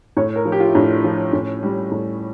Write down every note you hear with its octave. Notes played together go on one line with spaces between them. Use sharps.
A2 C#5
A#4
F3
G4
F4
E4
A2 D4
F3
A2 C#4
G3
A2